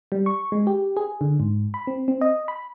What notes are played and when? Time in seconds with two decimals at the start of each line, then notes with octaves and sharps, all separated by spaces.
0.12 G3
0.26 C#6
0.52 G#3
0.67 G4
0.97 G#4
1.21 D3
1.40 G#2
1.74 B5
1.87 C4
2.08 C4
2.21 D#5
2.48 B5